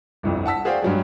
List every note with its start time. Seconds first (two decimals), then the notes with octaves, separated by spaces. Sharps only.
0.23 G1 C2 F2
0.46 F#5 A5 E6 B6
0.65 F#4 G#4 C5 D5 F5 G5
0.82 G2 F#3 G#3